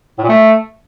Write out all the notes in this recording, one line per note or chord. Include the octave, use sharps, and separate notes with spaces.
A2
A#2
A3